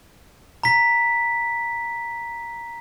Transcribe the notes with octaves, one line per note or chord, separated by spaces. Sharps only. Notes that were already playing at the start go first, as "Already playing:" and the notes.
A#5 B6